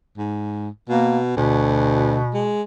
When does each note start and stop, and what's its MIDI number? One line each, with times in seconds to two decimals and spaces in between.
0.18 0.69 44
0.89 1.32 47
0.89 1.19 58
1.37 2.18 38
1.37 2.54 47
2.34 2.62 56